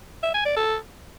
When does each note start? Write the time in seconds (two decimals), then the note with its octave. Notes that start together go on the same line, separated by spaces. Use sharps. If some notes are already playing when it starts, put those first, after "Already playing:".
0.23 E5
0.34 G#5
0.45 D5
0.56 A4